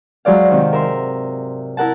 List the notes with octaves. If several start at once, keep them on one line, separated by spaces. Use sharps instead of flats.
F#3 G#3 C5 D5 F5
G#2 C3 D#3
A#4 E5 C6
E4 A#4 F#5 A5